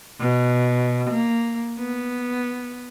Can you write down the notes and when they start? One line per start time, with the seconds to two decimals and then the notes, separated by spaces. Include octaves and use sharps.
0.20 B2
1.10 A#3
1.78 B3